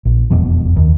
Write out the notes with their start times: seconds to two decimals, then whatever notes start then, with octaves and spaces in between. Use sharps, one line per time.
0.05 A#1
0.31 E1 F2 B2 F3
0.76 D#2